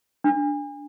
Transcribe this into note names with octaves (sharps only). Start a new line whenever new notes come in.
D4